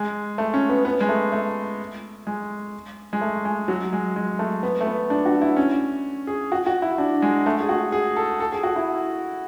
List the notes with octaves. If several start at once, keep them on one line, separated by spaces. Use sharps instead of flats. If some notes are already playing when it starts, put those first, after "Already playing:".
Already playing: G#3
A3
C#4
B3
B3
G#3
A3
A3
G#3
G#3
A3
G#3
F#3
G#3
G#3
A3
B3
A3
B3
D4
F#4
E4
C#4
G#4
F#4
F#4
E4
D4
G#3
A3
G#4
F#4
G#4
A4
A4
G#4
F#4
E4